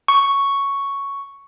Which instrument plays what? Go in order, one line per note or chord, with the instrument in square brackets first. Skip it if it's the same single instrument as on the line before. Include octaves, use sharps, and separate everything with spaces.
[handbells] C#6